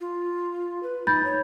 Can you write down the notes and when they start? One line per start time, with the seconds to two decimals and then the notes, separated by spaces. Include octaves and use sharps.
0.01 F4
0.83 B4
1.07 D#4 B5 G6 A6
1.25 C#5